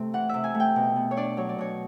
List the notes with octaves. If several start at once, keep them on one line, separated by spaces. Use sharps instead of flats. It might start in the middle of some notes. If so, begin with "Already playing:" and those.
Already playing: C3 A3 C4
E3 F#5
C3 E5
G#5
A3
G5
B2
B3
C#5
D4 D5
F#3 C#5
D5
B2 C#5